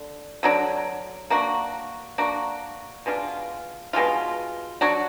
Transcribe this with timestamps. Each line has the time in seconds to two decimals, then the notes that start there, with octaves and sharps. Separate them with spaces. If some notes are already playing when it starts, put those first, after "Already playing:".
Already playing: D3
0.43 D3 F#3 D4
1.30 A#3 D4 F#4
2.18 A#3 D4 F#4
3.06 B2 G#3 D4 F4
3.93 B2 G#3 D4 F4
4.81 F#3 D4 F#4